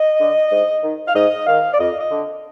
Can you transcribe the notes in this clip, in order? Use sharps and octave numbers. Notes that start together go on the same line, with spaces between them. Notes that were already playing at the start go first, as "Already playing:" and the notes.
Already playing: D#5
D3
G#2
D#3
F5
G#2 D#5
D#3 F5
D5
F2 D#5
D#5
D3